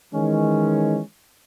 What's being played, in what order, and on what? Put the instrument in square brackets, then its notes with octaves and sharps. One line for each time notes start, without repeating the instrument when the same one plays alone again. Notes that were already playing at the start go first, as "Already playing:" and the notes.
[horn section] D#3 E3 G#3 C#4